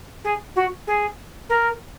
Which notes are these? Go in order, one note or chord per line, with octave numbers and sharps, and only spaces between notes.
G#4
F#4
G#4
A#4